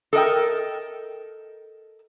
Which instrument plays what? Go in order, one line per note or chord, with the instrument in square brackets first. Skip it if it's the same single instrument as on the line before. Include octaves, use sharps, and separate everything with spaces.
[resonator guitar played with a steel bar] A4 A#4 D#5 G5